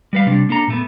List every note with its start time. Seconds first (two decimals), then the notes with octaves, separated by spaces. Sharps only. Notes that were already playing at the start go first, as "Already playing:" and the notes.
0.13 G3 B4 F5
0.27 C3 G3 D4
0.49 A#3 D4 A4 A#5
0.68 A#2 A3 B3